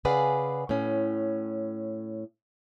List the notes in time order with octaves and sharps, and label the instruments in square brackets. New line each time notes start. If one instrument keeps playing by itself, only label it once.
[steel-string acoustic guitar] C#3 G#4 B4 D5 F5 F#5
A2 C#4